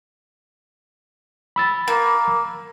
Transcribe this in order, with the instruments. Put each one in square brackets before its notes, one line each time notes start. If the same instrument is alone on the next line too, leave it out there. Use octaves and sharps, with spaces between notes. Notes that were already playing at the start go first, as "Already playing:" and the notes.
[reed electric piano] B5 E6 A6
[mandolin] A#3